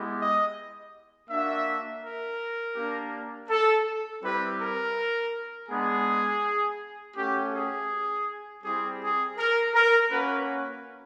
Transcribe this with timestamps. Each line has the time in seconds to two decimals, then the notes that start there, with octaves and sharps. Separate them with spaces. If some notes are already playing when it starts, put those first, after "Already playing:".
Already playing: G#3 B3 E4 G4
0.19 D#5
1.29 A#3 D4 F#4 E5
2.03 A#4
2.76 A#3 D4 G4
3.50 A4
4.23 G3 C4 E4 G4 B4
4.60 A#4
5.69 G#3 B3 D4 G#4
7.16 A3 C#4 F#4 G4
7.53 G#4
8.63 G3 C4 E4 G4 G#4
9.01 G#4
9.38 A#4
9.74 A#4
10.11 A#3 C#4 F#4 B4